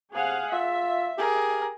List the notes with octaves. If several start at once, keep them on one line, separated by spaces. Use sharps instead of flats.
C3 G#4 F5 F#5
F4 E5
G4 G#4 A#4